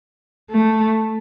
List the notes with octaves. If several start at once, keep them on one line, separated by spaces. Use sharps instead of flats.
A3